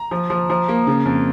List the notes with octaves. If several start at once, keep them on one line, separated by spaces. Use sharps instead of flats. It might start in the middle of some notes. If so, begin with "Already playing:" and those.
Already playing: A#5
F3
F3
F3
A#3
C#3
F2